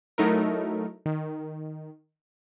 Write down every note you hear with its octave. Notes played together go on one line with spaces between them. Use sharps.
F#3 A3 D#4 E4 A#4
D#3